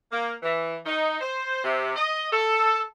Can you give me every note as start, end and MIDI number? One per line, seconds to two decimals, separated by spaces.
0.12 0.33 58
0.43 0.77 52
0.86 1.18 63
1.21 1.63 72
1.64 1.95 48
1.96 2.27 75
2.32 2.81 69